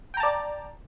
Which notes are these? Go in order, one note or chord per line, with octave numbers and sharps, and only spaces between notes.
D5 G5 A5 A#5